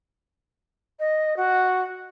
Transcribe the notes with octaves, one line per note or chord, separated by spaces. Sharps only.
D#5
F#4